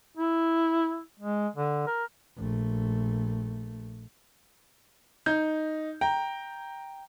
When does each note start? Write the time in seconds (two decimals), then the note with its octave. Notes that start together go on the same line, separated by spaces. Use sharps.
0.17 E4
1.19 G#3
1.56 D3
1.87 A#4
2.37 A#1 A3
5.26 D#4 G6
6.01 G5 A#5